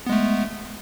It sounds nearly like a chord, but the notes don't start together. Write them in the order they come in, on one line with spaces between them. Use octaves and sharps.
B3 G#3 A3